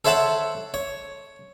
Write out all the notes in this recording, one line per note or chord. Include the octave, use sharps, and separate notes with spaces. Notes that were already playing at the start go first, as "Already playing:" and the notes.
A4 C5 C#5 E5 F#5 A5
C#5